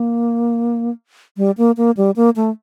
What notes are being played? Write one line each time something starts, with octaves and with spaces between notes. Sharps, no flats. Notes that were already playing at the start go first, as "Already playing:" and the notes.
Already playing: A#3
G3
A#3
A#3
G3
A#3
A3